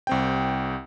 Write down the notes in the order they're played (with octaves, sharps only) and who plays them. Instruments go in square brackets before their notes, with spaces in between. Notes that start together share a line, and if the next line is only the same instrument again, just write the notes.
[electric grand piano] C2 C4 G5